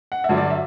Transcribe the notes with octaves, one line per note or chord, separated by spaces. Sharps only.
F#5
E5
G2 D3 F#3
D5
E5